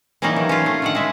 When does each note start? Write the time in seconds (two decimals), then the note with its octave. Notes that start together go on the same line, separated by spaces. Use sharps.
0.22 E3 F#3 G3 A#3 C#4 D#4
0.36 D#3
0.49 C#4 F4
0.66 A3
0.82 D3 D#3 F#5
0.95 G#3 E5